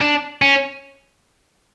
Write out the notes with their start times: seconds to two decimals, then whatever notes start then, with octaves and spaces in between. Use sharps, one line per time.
0.01 D4
0.42 C#4